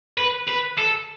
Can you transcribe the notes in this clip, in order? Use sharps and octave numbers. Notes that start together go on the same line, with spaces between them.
B4
B4
A4